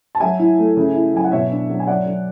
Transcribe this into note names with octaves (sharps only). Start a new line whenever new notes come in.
A5
F#3 E5 G#5
E4
A3
C#3
E4
F#3 G#5
F#5
B2 C#5 E5
D4
F#3
G#5
F#3 D5 F#5
F#3